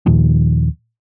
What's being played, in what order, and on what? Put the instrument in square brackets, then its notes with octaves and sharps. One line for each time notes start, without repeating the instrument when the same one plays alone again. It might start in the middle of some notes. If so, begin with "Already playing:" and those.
[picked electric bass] D#2 A#2 D#3 F3